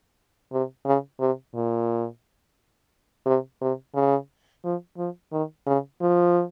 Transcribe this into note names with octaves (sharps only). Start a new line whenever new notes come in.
C3
C#3
C3
A#2
C3
C3
C#3
F3
F3
D#3
C#3
F3